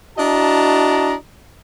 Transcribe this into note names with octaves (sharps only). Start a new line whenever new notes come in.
D4 E4 F#4 D#5 A5 A#5